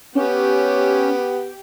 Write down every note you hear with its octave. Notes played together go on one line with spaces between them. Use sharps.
B3 C#4 G4